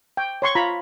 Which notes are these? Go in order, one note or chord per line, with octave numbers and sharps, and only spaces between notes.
G5
C#5 C6 C#6
F4 A#5 B5